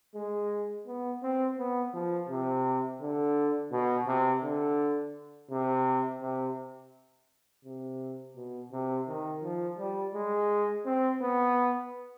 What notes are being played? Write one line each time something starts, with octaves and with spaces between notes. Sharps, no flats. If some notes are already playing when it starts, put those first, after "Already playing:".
G#3
B3
C4
B3
F3
C3
D3
B2
C3
D3
C3
C3
C3
B2
C3
D#3
F3
G3
G#3
C4
B3